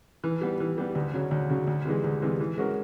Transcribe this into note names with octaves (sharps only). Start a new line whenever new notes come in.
E3
G3 B3
E3
G3 B3
D2
C#3 F#3
D2
C#3 F#3
D2
C3 E3 G#3
D2
C3 E3 G#3
E3
G#3 C#4 F#4 A#4